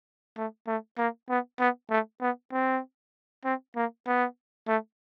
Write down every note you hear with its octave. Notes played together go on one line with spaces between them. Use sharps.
A3
A3
A#3
B3
B3
A3
B3
C4
C4
A#3
B3
A3